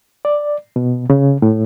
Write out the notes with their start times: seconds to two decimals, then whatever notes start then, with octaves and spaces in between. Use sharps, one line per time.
0.25 D5
0.76 B2
1.10 C#3
1.42 A2